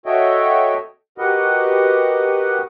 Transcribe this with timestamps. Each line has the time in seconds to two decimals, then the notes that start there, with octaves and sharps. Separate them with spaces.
0.06 F#4 A4 C#5 D#5 E5 G5
1.18 F#4 G4 A#4 B4 D#5 F#5